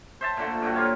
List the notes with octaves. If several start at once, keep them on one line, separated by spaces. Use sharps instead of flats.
C5 E5 A5
A#2 D3 A3
G2 A#2 A3 F#4
A#3 F4 C#5 F5